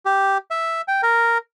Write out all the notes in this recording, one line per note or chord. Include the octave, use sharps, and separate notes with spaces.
G4
E5
G5
A#4